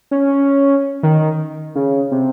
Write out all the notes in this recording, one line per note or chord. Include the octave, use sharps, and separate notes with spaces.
C#4
D#3
C#3
C3